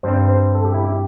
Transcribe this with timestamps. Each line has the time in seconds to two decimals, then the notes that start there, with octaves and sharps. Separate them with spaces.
0.03 G2 G3 C4 C5
0.29 C5
0.55 A4
0.65 G4
0.74 E4
0.85 G4